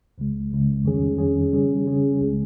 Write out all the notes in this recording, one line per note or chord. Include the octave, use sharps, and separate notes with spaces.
C#2 C#3 G#3
C#2 C#3 G#3
F2 D#3 G3 C#4 G#4
F2 D#3 G3 C#4 G#4
C#3 G3 C#4 G#4
C#3 G3 C#4 G#4
C#2 C#3 G#3